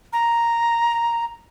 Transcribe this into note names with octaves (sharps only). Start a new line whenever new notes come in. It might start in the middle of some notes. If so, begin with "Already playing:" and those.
A#5